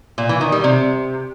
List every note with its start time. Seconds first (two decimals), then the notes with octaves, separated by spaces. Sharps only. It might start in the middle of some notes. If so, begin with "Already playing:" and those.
0.18 A#2
0.29 E3
0.41 D#3
0.52 G3
0.64 C3